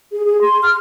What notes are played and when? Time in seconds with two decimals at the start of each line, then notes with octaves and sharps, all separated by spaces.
0.12 G#4
0.26 G#4
0.41 C6
0.63 F6